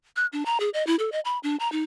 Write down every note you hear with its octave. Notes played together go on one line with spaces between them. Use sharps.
F#6
D4
A#5
G#4
D#5
E4
A4
D#5
B5
D4
A#5
D#4